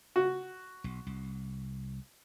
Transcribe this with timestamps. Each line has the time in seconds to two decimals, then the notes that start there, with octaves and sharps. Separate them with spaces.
0.16 F#4
0.84 B1
1.07 C2